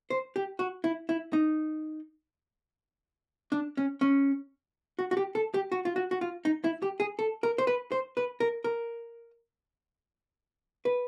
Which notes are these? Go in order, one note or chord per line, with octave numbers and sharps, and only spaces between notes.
C5
G4
F#4
E4
E4
D#4
D4
C#4
C#4
F#4
F#4
G4
A4
G4
F#4
F4
F#4
F#4
F4
D#4
E4
G4
G#4
A4
A#4
C5
B4
C5
B4
A#4
A#4
B4